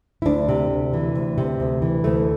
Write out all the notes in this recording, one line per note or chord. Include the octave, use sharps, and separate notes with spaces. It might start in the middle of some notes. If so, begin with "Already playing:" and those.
E4
D2 D4
C3
D2
E3
D2
C3
D2
E3
D2 A3